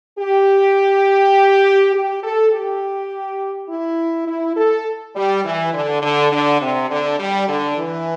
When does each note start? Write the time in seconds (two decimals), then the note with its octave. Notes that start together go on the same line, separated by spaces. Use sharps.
0.20 G4
1.95 G4
2.24 A4
2.53 G4
3.70 E4
4.28 E4
4.57 A4
5.15 G3
5.45 E3
5.74 D3
6.03 D3
6.32 D3
6.62 C3
6.90 D3
7.20 G3
7.49 D3
7.78 E3